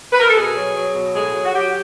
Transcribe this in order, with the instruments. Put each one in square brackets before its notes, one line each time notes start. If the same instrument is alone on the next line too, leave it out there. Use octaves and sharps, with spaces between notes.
[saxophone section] B4
A#4
A4
B2 G#4
F#3
F#3
B2
A2 G#4
F#3
F#4
F#3 G4